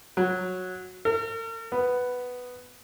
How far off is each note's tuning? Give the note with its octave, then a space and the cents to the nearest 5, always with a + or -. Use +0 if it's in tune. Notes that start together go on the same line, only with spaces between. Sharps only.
F#3 -10
A#4 -45
B3 +5